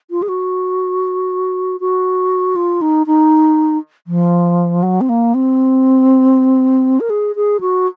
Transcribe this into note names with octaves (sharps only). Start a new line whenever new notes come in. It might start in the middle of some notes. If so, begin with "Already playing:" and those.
F4
G#4
F#4
F#4
F4
D#4
D#4
F3
F#3
C4
A#3
C4
A#4
G#4
G#4
F#4